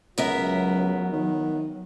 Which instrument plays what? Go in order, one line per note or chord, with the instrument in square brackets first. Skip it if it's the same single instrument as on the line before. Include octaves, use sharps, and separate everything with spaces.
[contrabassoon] C#2 [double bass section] F#3 [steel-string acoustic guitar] B3 A#4 E5
[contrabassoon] D#3